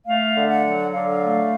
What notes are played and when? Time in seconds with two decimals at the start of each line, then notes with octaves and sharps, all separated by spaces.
0.07 A3 F5
0.35 D3
0.50 F#5
0.64 F#3
0.92 D3 F5
1.22 A3